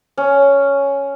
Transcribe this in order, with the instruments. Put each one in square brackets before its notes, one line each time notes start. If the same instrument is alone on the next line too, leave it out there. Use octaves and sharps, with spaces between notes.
[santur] C#4